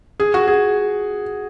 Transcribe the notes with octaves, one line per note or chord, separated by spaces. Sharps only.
G#4
F#4
G#4